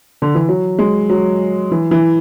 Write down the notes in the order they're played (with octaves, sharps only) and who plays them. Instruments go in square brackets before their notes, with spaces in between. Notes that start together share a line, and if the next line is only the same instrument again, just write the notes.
[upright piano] D3
E3
F#3
G#3
F#3
E3
E3